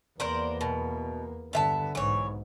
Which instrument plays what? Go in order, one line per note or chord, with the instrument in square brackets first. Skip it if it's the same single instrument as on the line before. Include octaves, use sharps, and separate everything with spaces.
[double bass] E2 A#3 [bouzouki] A#4 C5 D5
[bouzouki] B2
[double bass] G2 D3 [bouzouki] B3 E5 A5
[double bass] B1 G#2 [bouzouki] E3 C#5